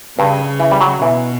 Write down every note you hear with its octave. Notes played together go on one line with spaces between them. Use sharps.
G2 C#3
E3
G3
F#3
B2 E3